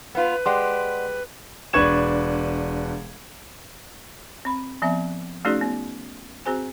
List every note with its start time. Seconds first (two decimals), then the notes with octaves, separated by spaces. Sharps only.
0.15 B3 F4 B4
0.46 G#3 G4 D5 F#5 C6
1.73 E1 D4 B4 C#6 G#6 E7
4.45 C4 B5
4.82 F3 B3 C4 E5
5.45 A3 C#4 D#4 F#4 G#4 D5
5.61 B3
6.46 C4 F#4 G#4 C5 G#5